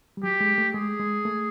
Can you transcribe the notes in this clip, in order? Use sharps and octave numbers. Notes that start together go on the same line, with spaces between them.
G3
F#3 G4
G#3
A3
G#3 G#4
G#3
A3